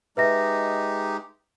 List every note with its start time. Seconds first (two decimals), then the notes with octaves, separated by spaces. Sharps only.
0.17 G#3 D#4 G4 B4 E5 A#6